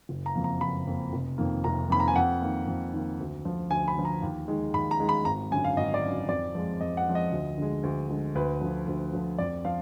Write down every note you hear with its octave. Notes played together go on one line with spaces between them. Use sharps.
F#1
A#5
F2 F3 A#3
A#5
F#1 B5
F2 F3 A#3
F1
F2 D#3 A#3
F1 A#5
F2 D#3 A#3 B5
A#5
G#5
F2 F#5
D#3 A#3
F2
D#3 A#3
D2
D3 F3
D2 G#5
B5
D3 F3
A#5
D#2
D#3 G#3
D#2 B5
A#5
D#3 G#3
B5
G#1 A#5
F#2 D3 G#5
F5
G#1 D#5
D5
F#2 D3
F2 D5
F3 G#3
F2 D#5
F#5
F3 G#3
D#5
D2
D3 G#3
D2
D3 G#3
D2 B4
D3 F3
D2
D3 F3
F2 D5
F3 F5